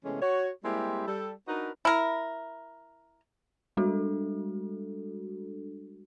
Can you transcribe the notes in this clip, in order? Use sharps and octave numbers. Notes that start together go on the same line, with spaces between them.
C3 E3 G#3 A3 B3 C#4
F#4 C#5
G3 G#3 A#3 C4 E4 G4
G3 A4
D4 D#4 F#4 A#4 B4
E4 A#4
G3 G#3 D4 F#4 A4